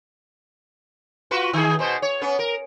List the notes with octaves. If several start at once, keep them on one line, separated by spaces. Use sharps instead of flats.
F4 F#4 B4
D#3 G#4
B2 B3 C5
C#5
B3 C#4
A#4